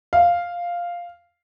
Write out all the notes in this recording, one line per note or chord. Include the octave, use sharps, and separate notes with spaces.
F5